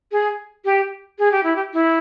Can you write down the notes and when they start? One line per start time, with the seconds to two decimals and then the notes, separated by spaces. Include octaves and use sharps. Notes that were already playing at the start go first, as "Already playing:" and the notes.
0.12 G#4
0.65 G4
1.19 G#4
1.32 G4
1.43 E4
1.56 G4
1.73 E4